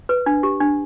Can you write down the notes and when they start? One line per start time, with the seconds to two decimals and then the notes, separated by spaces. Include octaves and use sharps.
0.09 B4
0.26 D4
0.43 G4
0.60 D4